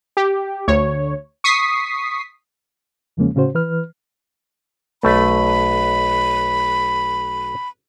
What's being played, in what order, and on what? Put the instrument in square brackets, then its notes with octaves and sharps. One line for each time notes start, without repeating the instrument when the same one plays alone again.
[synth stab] G4
D2 C#5
C#6 D#6 B6 C7
[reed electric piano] E2 C#3 F3 G#3 A#3 C#4
A2 C#3 C#4 F#4 C5
E3 B4 F6
[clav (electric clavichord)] B1 A3 [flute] B5